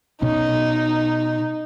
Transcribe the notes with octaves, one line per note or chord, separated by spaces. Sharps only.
B2 C#4 D#4